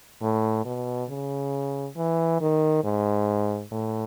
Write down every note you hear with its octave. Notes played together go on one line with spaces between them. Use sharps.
A2
B2
C#3
E3
D#3
G#2
A2